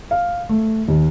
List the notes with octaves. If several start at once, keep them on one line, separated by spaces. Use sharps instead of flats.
F5
A3
D#2